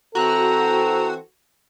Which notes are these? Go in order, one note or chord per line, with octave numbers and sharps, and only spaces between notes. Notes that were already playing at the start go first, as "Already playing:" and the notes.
E3 C4 F#4 A4 A#5